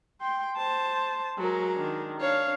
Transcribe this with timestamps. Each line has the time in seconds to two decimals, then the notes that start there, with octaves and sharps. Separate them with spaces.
0.21 G5 C6
0.57 C5 A5
1.38 F#3 G#3 A#4
1.75 D#3 D4
2.20 D4 C#5 F5